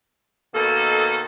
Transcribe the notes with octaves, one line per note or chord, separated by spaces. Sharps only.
B2 D#3 A#3 A4